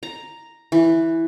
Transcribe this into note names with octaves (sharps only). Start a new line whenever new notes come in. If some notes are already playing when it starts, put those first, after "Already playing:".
A#5
E3